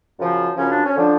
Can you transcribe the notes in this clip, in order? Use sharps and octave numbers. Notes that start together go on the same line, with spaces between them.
F#2 C#3 F3
F#2 C#3 F3 C#4
D4
C#4
D3 F3 D4